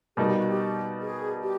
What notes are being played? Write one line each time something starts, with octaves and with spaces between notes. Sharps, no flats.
B2 G3 A#3 D#4 G#4
G4
F#4
G4
G#4
G4